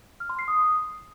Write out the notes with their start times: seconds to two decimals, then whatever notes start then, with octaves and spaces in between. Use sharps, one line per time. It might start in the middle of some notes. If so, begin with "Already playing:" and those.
0.20 F6
0.29 C6
0.39 C7
0.48 D#6